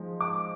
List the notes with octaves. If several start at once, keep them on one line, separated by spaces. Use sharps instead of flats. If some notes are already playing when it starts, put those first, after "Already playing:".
Already playing: F3 G#3 D#4
D6